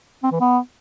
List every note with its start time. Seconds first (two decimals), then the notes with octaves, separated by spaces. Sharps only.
0.23 C4
0.32 E3
0.40 B3